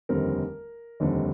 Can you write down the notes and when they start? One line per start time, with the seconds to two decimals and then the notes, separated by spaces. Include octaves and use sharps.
0.09 F1 D#2 D3 G3 C4 A#4
1.00 F1 D#2 D3 G3 C4